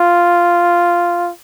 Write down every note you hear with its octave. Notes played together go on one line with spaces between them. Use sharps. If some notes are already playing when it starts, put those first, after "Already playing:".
Already playing: F4